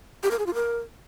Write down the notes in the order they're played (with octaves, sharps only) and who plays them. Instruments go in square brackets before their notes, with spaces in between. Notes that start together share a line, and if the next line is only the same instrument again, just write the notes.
[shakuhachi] G4
A#4
G#4
F4
A#4